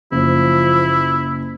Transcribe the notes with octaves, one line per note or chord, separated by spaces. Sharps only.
F#1 F3 E4